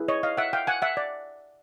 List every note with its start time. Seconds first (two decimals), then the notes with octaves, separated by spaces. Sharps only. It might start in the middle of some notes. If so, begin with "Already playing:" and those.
Already playing: E4 G#4 B4
0.08 C#5 D#5
0.23 D#5 F5
0.37 E5 F#5
0.53 F5 G5
0.67 F#5 G#5
0.82 E5 F#5
0.97 D5